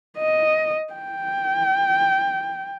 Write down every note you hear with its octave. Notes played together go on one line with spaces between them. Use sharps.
D#5
G5